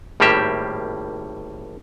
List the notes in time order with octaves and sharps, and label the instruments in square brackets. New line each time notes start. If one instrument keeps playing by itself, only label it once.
[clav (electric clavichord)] G#1 A2 G3 A#3 G4 E5